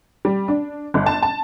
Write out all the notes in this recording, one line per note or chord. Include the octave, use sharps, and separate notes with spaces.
G3
D4
G1
A5
A5